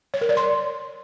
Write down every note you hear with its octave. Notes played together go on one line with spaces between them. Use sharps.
C#5
A#4
D5
C6